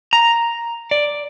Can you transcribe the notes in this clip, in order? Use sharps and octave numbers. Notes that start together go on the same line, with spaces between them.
A#5
D5